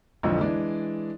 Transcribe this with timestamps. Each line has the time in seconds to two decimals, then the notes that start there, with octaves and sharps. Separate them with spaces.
0.23 B1 F2 G#2 D3 E3 F3
0.41 E3 G#3 D4 D5